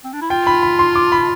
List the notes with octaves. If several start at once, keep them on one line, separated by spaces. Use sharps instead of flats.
C4
D4
E4
F4 G5
B5
B5
C6
D6
B5